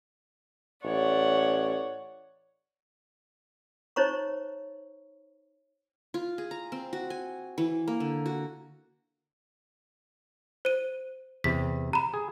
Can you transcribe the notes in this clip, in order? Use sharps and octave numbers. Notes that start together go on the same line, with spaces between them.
A1 C#5 D5 F#5
D#4 C5 C#5 A#5 C#6
F4
G#4
A#5
C4
F#4
G#5
E3
A#3
D3
F#4
C5 D#7
E2 C3 B6
A#5 B5
G#4